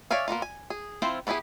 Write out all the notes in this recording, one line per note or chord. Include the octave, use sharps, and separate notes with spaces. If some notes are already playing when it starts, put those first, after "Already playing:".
C#5 D5 E5 F5 G#5
A#3 B3 D#4 F4
G#5
G#4
F3 C4 E4 F4 C5
B3 D4 E4 G4 G#4